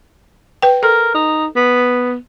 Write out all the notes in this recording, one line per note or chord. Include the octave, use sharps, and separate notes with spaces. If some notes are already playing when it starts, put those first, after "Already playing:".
B4 G5
A4 A#4
D#4
B3